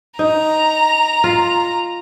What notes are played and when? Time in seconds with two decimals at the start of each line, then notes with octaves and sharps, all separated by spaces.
0.19 D#4 A#5
1.24 F4